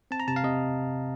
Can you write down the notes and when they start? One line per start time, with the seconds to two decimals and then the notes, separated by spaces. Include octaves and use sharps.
0.11 C4 A5
0.20 A#5
0.28 C3 A5
0.36 F5
0.44 C3 D#5